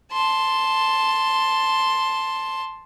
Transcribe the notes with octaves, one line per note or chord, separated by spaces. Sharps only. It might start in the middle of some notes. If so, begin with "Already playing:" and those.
A5 C6